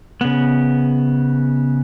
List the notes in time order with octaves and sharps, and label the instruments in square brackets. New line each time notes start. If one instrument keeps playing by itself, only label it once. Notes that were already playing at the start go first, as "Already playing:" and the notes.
[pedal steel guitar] C#3 B3